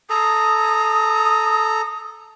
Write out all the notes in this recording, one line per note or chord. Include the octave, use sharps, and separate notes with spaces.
A4 A#5 D#6